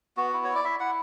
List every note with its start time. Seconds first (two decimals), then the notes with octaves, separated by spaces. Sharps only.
0.17 B3 F#4
0.33 E4
0.44 E4 C#5
0.55 D5
0.65 E4 E5
0.80 E4 F#5